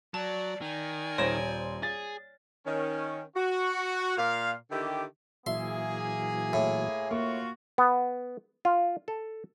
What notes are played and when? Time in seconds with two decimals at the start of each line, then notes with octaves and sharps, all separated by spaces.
0.14 F#3 D5 A5
0.62 D#3 D5 G#5
1.18 D#1 C5 C#5 A#6 D7 E7
1.83 G#4 A6
2.66 D#3 C#4
3.36 F#4
4.17 A#2 F5
4.71 D3 D#3 E4 G4
5.46 A#2 E3 F#3 A#3 G#4 E5 C6
6.53 A2
7.11 A#3 F4 F#4 C#6
7.78 B3
8.65 F4
9.08 A4